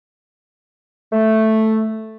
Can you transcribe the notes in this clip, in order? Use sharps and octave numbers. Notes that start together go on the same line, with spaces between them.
A3